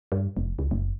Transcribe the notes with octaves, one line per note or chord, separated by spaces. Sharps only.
G2
F1
C#2
F#1